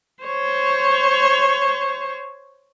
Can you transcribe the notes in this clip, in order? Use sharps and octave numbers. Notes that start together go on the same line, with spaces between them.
C5 C#5